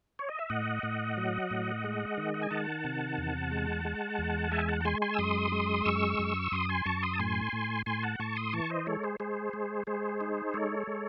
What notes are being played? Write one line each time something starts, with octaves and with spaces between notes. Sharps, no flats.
C#5
D#5
E5
A2 D#5 F#5
A2
F#3
A2
G#3
D#3
F#5
G#5
D#3 F#5 A5
C3
E2
G#3
G#3
E2
G#3 E5 G#5
F#5 A5
A5
G#3 G#5 C6
G#5 C6
E6
F#2 C6 D#6
G#3
F#2 C#6 E6
F#2
F#2 C6 D#6
G#5 C6
F#2 A5 C#6
C6 D#6
A5
A2 G#5 C6
A2
A2 G#5 C6
F#5 A5
A2 A5 C#6
C6 D#6
E3 A5 C#6
C5 D#5
G#3 A4 C#5
G#4 C5
G#3 G#4 C5
G#3
G#3 G#4 C5
D#4
G#3 A4 C#5
G#3